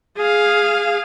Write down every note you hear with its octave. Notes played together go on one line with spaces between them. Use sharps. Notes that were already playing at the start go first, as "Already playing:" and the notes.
G#4 F5